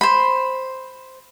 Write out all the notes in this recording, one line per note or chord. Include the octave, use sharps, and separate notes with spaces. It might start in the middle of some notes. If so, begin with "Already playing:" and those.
C5 B5